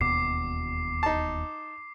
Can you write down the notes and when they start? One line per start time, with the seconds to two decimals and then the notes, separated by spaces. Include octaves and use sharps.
0.01 E1 D#2 B2 D6 C7
1.03 D#4 A5